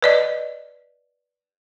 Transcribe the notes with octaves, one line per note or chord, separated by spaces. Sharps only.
B4 D5 D#5